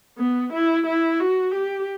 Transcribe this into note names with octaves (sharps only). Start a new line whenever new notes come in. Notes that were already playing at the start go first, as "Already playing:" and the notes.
B3
E4
E4
F#4
G4